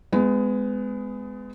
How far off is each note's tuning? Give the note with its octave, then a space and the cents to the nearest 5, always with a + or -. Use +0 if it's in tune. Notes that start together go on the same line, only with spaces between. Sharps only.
G#3 +0 B3 +30